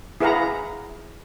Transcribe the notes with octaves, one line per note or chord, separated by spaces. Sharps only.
E4 G#4 B4 F5 F#5 A#5